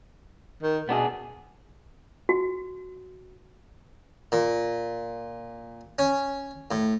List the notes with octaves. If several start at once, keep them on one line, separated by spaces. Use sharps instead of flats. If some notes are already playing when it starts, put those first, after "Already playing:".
D#3
B2 B3 D4 G#4
F#4
A#2
C#4
A2